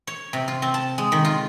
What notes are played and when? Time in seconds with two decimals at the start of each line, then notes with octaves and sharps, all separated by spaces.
0.07 C#5
0.33 C3
0.48 F4
0.62 C4
0.74 A5
0.98 G#3
1.12 D#3
1.25 F4